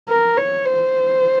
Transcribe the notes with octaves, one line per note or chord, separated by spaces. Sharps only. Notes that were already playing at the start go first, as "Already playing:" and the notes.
A#4
C#5
C5